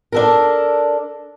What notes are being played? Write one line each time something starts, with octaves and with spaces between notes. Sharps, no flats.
D4 A4 A#4